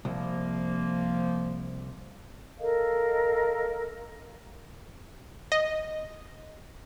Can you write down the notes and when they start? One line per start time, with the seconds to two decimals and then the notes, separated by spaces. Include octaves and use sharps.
0.05 C2 F3 A#3
2.59 A4 A#4 D#5 F5
5.52 D#5